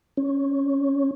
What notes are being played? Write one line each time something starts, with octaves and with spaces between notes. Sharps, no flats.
C#4